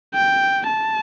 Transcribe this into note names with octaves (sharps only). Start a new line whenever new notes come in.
G5
A5